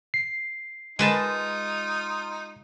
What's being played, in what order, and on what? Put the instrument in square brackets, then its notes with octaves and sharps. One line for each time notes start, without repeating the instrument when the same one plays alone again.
[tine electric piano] C7
[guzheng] G#3 B4 A5 [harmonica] D#4 F4